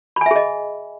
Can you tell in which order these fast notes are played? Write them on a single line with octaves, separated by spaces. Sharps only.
B5 G#5 E5 G#4 D#5